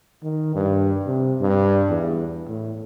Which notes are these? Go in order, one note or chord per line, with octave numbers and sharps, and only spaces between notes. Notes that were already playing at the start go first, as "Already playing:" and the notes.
D#3
G2
C3
G2
E2
A2